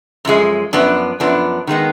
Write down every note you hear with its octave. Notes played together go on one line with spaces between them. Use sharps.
F#2 F3 G#3
F#2 F3 B3 D4
F#2 F3 B3 D4
D#3 G#3 B3 D#4